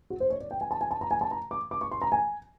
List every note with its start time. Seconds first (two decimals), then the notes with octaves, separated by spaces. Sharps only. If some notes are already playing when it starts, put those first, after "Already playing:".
0.10 F#4
0.20 C5
0.30 C#5
0.40 D5
0.51 G5
0.61 G#5
0.71 A5
0.81 G#5
0.91 A5
1.01 A#5
1.11 G#5
1.21 A5
1.31 A#5
1.51 D6
1.71 D6
1.81 C#6
1.91 C6
2.02 A#5
2.12 G#5